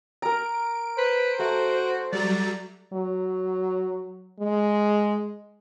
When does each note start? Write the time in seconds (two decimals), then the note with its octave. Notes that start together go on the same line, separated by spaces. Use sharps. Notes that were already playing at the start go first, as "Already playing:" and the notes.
0.22 A#4 A#5 D7
0.98 B4 C5
1.39 A3 F#4
2.12 F#3 G3 D5 A#5
2.93 F#3
4.40 G#3